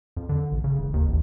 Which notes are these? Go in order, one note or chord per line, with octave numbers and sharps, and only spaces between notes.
F2
D3
A1
C#3
E1
D#2
A1